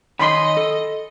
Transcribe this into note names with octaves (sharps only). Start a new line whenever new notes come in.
D#3 C#5 D#5 G#5 B5 C6
A4